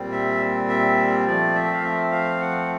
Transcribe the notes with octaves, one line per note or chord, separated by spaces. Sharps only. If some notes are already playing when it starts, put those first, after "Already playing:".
Already playing: A#2 G3 C4
E5
E5
F3 A3 C4 D5
E5
F5
E5
F5
F#5